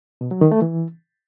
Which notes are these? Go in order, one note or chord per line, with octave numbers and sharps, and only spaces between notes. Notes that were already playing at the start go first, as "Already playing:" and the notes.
B2
F#3
D#3
A3
E3